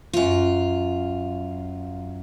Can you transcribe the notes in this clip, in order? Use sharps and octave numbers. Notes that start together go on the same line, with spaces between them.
F#2 F4